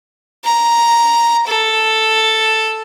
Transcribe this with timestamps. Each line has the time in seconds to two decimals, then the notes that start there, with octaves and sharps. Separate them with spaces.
0.45 A#5
1.47 A4